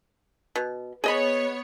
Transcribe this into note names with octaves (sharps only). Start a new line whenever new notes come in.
B2
B3 G#4 C#5 D#5 B5